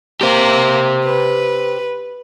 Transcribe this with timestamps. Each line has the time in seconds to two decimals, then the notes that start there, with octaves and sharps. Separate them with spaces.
0.21 A#3 G4 C5
1.04 B4